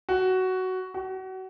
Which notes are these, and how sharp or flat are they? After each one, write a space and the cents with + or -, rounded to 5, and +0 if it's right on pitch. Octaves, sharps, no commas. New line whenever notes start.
F#4 +10
F#4 +30